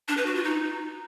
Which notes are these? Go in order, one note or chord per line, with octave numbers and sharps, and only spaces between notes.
D4
B4
F#4
F4
D#4